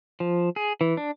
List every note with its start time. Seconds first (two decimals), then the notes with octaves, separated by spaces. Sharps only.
0.20 F3
0.56 G#4
0.81 E3
0.97 D4